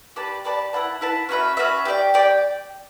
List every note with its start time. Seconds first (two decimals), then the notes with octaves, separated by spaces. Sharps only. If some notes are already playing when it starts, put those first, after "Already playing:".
0.16 G4 B4 D5 A5
0.45 G4 B4 D5 A5
0.73 E4 B4 F#5 A5
1.01 E4 B4 F#5 A5
1.29 C#4 F#4 B4 E5
1.57 C#4 F#4 B4 E5
1.85 G4 D5 G5
2.14 G4 D5 G5